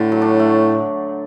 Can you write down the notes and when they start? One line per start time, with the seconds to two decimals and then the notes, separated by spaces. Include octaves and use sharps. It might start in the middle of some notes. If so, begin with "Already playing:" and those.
Already playing: A2 D3
0.12 F#3
0.22 D4
0.40 A3